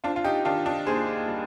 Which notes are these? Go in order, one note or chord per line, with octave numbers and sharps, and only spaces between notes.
C4 D4 F4
F4
D#4 G4
D#3 D4 F4
D4
D#2 G#4 C5
G3